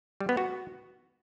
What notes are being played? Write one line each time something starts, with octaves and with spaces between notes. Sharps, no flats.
G3
B3
F#4